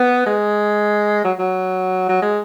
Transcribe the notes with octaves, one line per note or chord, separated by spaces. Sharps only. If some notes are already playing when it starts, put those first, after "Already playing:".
Already playing: B3
G#3
F#3
F#3
F#3
G#3